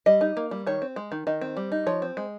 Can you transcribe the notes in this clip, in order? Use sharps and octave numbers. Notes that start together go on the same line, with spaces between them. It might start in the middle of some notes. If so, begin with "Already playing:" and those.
G3 D#5
D#4
A#3
G3
D#3 C#5
C4
G#3
D#3
D#3 D#5
C4
G3
D#4
F3 C#5
C4
G#3